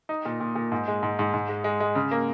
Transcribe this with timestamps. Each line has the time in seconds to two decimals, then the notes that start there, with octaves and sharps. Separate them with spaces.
0.09 D#4
0.25 A#2
0.40 A#2
0.55 A#2
0.72 G#2
0.88 G#3
1.03 G#2
1.19 G#2
1.34 G#2
1.49 G#3
1.64 G#3
1.80 G#3
1.95 C#3
2.11 A#3